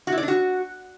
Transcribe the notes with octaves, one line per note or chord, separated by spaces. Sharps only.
F#4
E4
D5
D4
F#4